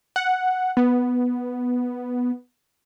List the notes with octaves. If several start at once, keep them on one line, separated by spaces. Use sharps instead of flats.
F#5
B3